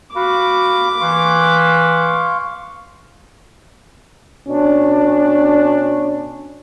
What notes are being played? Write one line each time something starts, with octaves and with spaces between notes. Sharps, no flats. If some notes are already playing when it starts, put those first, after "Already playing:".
F#4 F5 B5 D6
E3 F5 C6 C#6
B2 C#4 D4